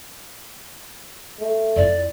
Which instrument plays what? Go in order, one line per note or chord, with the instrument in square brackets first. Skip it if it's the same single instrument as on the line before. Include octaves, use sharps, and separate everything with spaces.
[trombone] A3
[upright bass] F2 E4 [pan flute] D5